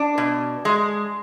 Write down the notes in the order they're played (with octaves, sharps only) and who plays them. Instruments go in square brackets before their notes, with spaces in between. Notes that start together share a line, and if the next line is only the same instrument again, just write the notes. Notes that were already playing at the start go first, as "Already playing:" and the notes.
Already playing: [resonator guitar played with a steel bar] D4
B2
G#3